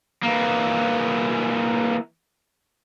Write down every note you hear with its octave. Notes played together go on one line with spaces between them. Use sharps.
E3 A#3